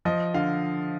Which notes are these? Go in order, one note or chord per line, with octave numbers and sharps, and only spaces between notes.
F3 D#5
D3 F5